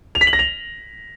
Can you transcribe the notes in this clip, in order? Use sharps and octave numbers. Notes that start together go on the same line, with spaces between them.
F7
B6
F#7
A#6
F7